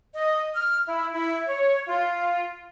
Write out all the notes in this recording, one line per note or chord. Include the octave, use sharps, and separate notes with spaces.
D#5
F6
E4
E4
C#5
F4